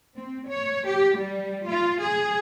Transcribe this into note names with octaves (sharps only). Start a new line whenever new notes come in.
C4
C#5
G4
G3
F4
G#4